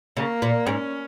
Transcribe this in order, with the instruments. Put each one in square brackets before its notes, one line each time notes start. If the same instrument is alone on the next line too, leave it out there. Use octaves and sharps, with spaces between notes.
[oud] C#3 [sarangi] A#3
[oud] A#2
[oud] G#2 [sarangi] C#4